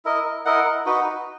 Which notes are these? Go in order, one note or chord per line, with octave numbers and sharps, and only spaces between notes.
E4 A#4 D#5
E4 A#4 D#5 F#5
D#4 F#4 B4